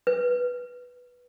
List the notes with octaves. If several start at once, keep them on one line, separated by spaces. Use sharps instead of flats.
B4